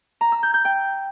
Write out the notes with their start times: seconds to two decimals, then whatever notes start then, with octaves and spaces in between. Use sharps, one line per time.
0.21 A#5
0.32 E6
0.43 G6
0.54 G6
0.65 G5